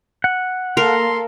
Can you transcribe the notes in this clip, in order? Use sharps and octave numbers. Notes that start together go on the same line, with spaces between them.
F#5
A#3 A4 A#4 F5 C6